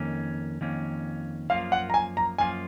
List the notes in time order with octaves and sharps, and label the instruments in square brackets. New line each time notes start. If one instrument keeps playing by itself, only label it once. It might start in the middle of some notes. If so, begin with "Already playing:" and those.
Already playing: [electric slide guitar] F2 D#3 A#3 C#4
F2 D#3 A#3 C#4
[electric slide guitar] F#2 F3 A#3 F4 [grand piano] F5
[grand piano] F#5
A#5
G#5
A#5
[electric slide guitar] F#2 F3 A#3 F4 [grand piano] G#5